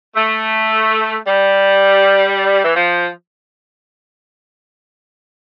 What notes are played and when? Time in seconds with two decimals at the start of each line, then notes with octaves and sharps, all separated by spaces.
0.16 A3
1.27 G3
2.65 E3
2.76 F3